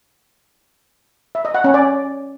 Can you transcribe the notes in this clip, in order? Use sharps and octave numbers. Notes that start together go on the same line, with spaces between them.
E5
D#5
F#5
C#4
D5